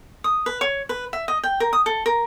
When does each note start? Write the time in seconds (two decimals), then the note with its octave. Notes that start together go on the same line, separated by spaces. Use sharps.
0.24 D#6
0.46 B4
0.61 C#5
0.89 B4
1.13 E5
1.28 D#5
1.44 G5
1.60 A#4
1.73 D#6
1.86 A4
2.06 A#4